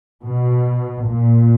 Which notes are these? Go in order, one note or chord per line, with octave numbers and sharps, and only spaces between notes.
B2
A#2